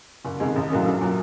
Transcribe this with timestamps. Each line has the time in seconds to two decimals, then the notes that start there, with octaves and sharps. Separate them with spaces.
0.25 F#1
0.39 F2 C3 D#3 G#3
0.56 A1
0.70 A2 F#3 A#3 C#4
0.86 A#1
1.01 A#2 F#3